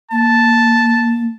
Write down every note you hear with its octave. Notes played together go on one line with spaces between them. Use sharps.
A#3 A5